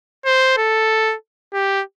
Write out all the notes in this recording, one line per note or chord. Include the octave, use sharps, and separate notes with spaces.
C5
A4
G4